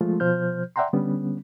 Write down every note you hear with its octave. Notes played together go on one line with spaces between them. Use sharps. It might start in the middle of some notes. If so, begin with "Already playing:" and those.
F3 G#3 A3 F4
B2 F3 C5 F6 G6
D5 E5 F#5 G5 A#5 C6
D3 G3 B3 C#4